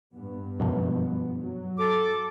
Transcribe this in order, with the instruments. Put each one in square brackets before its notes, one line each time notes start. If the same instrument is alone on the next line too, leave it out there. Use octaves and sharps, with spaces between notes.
[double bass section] G2 B3
[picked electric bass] F#2 B2 F3
[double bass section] F#3
[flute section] A4 D6